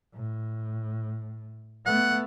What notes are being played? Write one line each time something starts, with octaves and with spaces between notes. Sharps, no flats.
A2
A3 B3 F#5